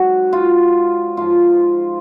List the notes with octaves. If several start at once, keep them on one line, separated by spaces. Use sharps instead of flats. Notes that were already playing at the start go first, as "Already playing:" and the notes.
Already playing: G#2 F#3 F#4
F4
G#2 F3 F4